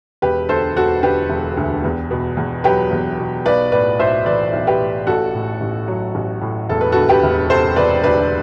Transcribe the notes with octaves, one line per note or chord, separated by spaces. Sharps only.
E1 G4 B4
D2 A4 C5
E1 F#4 A4
D3 G4 B4
E1
D2
E2
B2
E2
F#3 G4 B4
E2
B2
B1 B4 D5
A2 B4 D5
B1 C5 E5
E3 B4 D5
B1
G4 B4
A2
A1 F#4 A4
A2
A1
F#3
A1
A2
E1 A4
B4
D2 F#4 A4
G4 B4
E1
C3 A4 C5
E1 B4 D5
D2 B4 D5